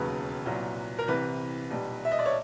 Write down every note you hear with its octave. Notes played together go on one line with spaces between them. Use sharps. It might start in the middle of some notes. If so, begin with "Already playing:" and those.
Already playing: E1 D#2 C#3 F#3 B4
C2 A#2 F#3
A#4
C2 C3 E3 B4
B1 A#2 G3
E5
D#5
D5
C#5